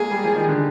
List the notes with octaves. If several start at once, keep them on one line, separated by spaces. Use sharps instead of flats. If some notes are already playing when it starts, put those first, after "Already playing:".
Already playing: G#3 A#3 G#4
G3
F3
D#3
D3